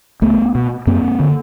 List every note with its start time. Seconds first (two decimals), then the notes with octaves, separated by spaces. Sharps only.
0.22 C#2 A3 B3
0.55 B2
0.87 F#2 A#3 C4
1.20 D3